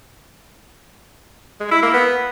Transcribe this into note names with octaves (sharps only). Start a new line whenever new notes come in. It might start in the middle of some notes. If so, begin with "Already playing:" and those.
G#3
E4
A#3
B3